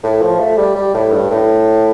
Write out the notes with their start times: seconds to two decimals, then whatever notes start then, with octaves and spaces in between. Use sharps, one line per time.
0.03 A2
0.21 F3
0.39 A3
0.57 G3
0.75 G3
0.94 A2
1.11 G2
1.31 A2